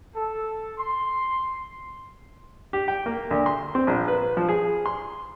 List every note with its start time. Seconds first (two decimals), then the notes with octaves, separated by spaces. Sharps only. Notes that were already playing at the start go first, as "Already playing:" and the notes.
0.15 A4
0.77 C6
2.73 G4
2.88 G5
3.06 A#3
3.31 D2
3.46 C6
3.75 C4
3.87 A#1
4.08 B4
4.37 F3
4.49 G#4
4.86 C6